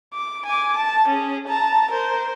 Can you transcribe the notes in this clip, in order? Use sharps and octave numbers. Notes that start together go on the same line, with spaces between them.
D6
G#5 D6
A5
C#4 G#4
A5 A#5
A#4 C5